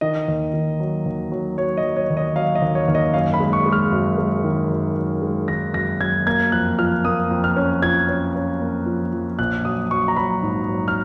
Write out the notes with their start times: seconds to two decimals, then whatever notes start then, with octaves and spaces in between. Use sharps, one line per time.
0.01 D#3 D#5
0.28 D#2
0.54 D#3
0.80 F#3
1.06 D#2
1.32 F#3
1.58 F#3 C#5
1.77 D#5
1.84 F#3
1.96 C#5
2.10 D#2
2.17 D#5
2.36 F#3 F5
2.55 D#5
2.62 D#2
2.75 C#5
2.88 D#2
2.95 D#5
3.14 F#2 F5
3.34 B5
3.40 G#3
3.53 C#6
3.66 G#3
3.72 F6
3.92 F#2
4.18 G#3
4.44 D#3
4.70 F#2
4.96 F#2
5.22 G#3
5.48 D#3 A#6
5.74 F#2 A#6
6.00 F#2 G#6
6.26 A#3 G#6
6.52 F2 F#6
6.79 F3 F6
7.05 A#3 D#6
7.31 F2
7.44 F6
7.57 C#4
7.82 F3 G#6
8.09 C#4
8.35 C#4
8.61 A#3
8.86 F3
9.13 F3
9.39 A#1 F#6
9.65 F#3 D#6
9.91 F#3 C#6
10.08 A#5
10.17 F#3 B5
10.43 G#2
10.69 F#3
10.88 F6